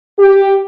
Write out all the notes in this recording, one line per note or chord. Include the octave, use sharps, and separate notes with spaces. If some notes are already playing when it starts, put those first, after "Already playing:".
G4